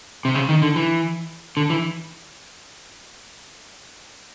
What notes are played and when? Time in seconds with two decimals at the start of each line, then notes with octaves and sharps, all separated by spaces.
0.25 C3
0.35 C#3
0.49 D#3
0.62 D3
0.76 E3
1.57 D3
1.70 E3